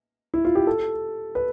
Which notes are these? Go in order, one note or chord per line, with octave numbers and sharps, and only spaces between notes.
E4
F4
G4
A4
B4